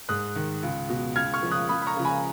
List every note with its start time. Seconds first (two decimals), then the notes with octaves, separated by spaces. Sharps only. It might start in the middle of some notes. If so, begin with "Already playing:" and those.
0.09 G#2 D#6 F#6
0.36 D#3
0.63 C#2
0.89 B2
1.16 C#2 F6 G#6
1.34 C#6 F6
1.43 C#3 F3
1.51 D#6 F#6
1.69 C#2 B5 D#6
1.82 B5
1.87 A#5 C#6
1.96 C#3 F3
2.05 G#5 B5